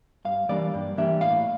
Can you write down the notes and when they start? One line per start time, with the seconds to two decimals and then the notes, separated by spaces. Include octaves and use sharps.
0.25 G2 F5
0.49 E3 G3 A#3 D4 D5
0.74 G2
0.97 E3 G3 A#3 D4 E5
1.21 A2 F5